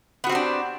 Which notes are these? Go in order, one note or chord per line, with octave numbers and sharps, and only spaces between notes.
B3 C4 D4 F#4 G4